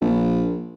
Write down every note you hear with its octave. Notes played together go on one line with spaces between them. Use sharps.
A#1